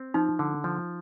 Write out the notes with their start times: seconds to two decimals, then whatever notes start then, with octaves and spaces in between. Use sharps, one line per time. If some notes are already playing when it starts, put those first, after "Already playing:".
Already playing: C4
0.14 F3 D#4
0.39 D3
0.64 F3